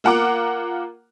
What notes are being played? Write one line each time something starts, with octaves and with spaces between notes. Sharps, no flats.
A#3 F4 F#5 A#5 D6